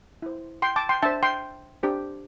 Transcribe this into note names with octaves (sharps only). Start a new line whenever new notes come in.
E4 C5
G5 C6
A5 D6
G5 C6
D4 C5 E5 A5
G5 C6
D4 G4 C5